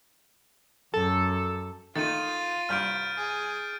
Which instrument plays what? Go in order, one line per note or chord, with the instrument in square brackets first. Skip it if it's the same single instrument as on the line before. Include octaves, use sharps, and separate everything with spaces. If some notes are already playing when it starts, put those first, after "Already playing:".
[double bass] F#2 [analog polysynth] A4
[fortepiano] D#3 A3 D#4 [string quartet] F4 [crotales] A6 D#7
[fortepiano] C2 G2 [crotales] F6 G6 D7
[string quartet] G#4